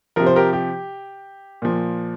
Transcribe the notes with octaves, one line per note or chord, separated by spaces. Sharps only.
C3 F3 A#4
C5
G4 A#4
G4
A#2 F3